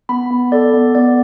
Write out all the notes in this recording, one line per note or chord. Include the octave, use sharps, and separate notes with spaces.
B3 B5
B3
A4 D5
B3
B3 D5